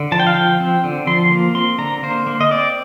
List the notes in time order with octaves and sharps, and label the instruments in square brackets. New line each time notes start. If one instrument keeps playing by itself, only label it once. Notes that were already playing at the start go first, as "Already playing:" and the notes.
Already playing: [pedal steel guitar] D3
F3 A5
G5
F5
F3 G5
C4
D3
F3 C6
A#3
C4 C6
D3 A#5
A#3 C5
A#3
D#5
C4 D5